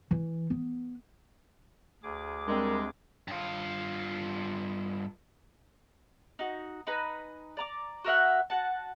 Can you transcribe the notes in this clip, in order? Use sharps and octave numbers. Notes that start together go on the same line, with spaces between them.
E3
B3
D2 G#4 D6
G3 G#3 C4 D4 A#4
G2 F4
D#4 F#4
D#4 B4 G#5 A#5
D5 A#5 D6
F#4 A#4 E5 F#5
F#4 F#5 A5